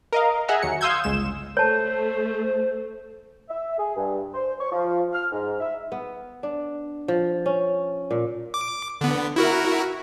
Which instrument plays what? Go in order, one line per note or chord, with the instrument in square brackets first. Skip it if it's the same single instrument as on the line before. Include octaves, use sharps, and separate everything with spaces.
[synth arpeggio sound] A#4 D#5 F5
G#4 D#5 E5 F#5 G#5 A#5
D#2 F#3 C#7
F5 C6 D#6 E6 G6 G#6
G1 C#2 G#3 E7
[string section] A3 [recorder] C5 [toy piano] C#5 A5
[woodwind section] E5
G#4
G2
C5
C#6
F3
F6
G#2
E5
[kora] B3
D4
F3
C#4
A#2
[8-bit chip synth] D6
D3 B3
E4 F#4 A#4